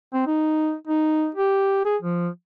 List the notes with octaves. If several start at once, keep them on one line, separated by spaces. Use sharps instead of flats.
C4
D#4
D#4
G4
G#4
F3